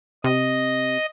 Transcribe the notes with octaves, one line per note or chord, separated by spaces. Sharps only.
C3 D#5